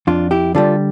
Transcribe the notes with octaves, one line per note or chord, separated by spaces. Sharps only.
F2 D4 F4
E4 G4
D3 G3 F4 A4